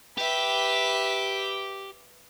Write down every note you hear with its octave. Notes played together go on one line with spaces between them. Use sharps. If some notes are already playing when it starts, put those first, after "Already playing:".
G4 B4 E5